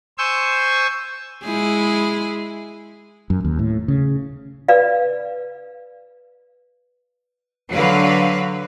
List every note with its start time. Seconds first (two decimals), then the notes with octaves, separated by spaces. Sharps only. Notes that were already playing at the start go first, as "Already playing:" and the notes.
0.18 C5 G#5 C#6 E6 G6
1.45 G#3 E4 G#4
3.30 F#2
3.45 D#2
3.59 A2
3.88 C#3
4.68 B4 D5 F5
7.72 D3 F#3 B4 F5